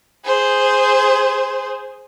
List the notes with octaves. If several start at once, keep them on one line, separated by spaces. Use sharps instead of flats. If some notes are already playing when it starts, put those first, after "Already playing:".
G#4 C5